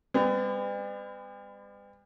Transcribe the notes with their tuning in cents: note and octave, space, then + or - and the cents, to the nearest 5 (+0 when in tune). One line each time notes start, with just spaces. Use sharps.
G3 +40 B3 +45